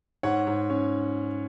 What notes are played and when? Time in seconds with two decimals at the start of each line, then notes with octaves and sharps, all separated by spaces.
0.23 G#2 C#5 F#5
0.47 G#2
0.70 C#4